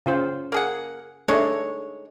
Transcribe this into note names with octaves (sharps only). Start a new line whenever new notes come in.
C#3 F4 C5
A#3 G#4 F#5
G#3 A3 D4 D#4 C#5